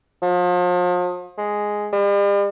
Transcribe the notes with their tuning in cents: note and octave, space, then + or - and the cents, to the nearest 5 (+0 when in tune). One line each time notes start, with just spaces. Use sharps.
F3 +40
G#3 +0
G3 +45